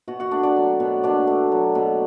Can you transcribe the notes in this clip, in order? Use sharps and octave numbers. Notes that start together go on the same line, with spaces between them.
B2 F#4 F#5
F#4 F#5
A3 D4 D5
D4 D5
F#3
B2
B2 D4 D5
A3
F#3
B2